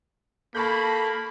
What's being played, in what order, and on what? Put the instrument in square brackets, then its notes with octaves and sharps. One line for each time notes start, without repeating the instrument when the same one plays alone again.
[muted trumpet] A#3 [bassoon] A4 [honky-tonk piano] A5 C#6 G6 [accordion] B5